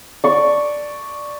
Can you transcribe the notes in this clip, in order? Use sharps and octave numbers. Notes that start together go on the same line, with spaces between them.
D5 C#6